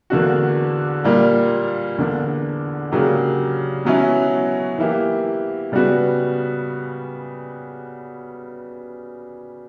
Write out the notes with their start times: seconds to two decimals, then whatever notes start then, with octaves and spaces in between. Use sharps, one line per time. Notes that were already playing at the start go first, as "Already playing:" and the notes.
0.10 E2 D3 A#3 D4 F#4
1.04 A#2 G3 A#3
1.98 E2 D3 A#3 D4
2.92 C#3 F#3 A#3 D4 G4
3.85 B2 F#3 C#4 E4
4.78 E3 A#3 E4 G4
5.72 C#3 G3 B3 F#4